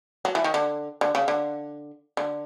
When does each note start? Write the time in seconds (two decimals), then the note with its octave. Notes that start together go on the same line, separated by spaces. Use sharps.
0.25 F#3
0.35 E3
0.44 D#3
0.54 D3
1.01 D3
1.15 C#3
1.28 D3
2.17 D3